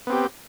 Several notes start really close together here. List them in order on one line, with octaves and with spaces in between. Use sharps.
B3 C4 G4